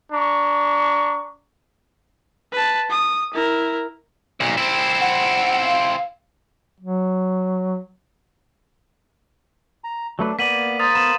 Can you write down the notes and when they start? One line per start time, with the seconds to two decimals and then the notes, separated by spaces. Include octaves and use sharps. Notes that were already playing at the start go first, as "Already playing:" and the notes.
0.13 D4 A#5 C#6
2.53 B4 A5
2.90 D#6
3.34 E4 A#4
4.40 B1 A#2
4.58 C4 E4
5.00 F#5
5.65 F5
6.80 F#3
9.84 A#5
10.19 F#3 A3 D4 B4
10.39 A#3 B3 D5 B6 D#7 F#7
10.79 A#4 C5 F5 D#6 A6
10.95 B3 B5 D#6 E7